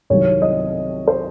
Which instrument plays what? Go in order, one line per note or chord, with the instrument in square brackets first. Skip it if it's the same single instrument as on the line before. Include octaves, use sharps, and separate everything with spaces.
[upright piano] C2 C3 D#3 F#3 C#5
D#5
C5